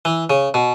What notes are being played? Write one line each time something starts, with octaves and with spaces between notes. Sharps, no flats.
E3
C#3
B2